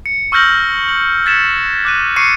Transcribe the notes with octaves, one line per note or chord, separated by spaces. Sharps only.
C#7
C#6 E6 F6 G6 A#6 F#7
F#7
F#6 G#6 A6 B6 C#7 E7
D6 F#6 D#7
C#6 D6 C7 C#7 D#7